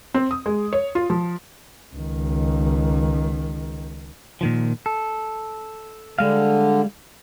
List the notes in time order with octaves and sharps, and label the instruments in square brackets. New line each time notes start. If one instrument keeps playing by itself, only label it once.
[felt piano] C4
D#6
G#3
C#5
F4
F3
[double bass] C#2 D#3
[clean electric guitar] A#2 D#3 F3
A4
[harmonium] D3 [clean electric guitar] G3 G#3 F5